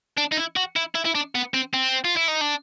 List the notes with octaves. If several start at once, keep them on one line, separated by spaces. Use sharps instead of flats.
D4
D#4
E4
F#4
E4
E4
E4
D4
B3
C4
C4
F4
E4
D#4
D4